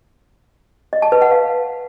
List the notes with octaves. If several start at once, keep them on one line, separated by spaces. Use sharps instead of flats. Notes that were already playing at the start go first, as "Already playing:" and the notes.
D#5
A5
B4
F#5
F5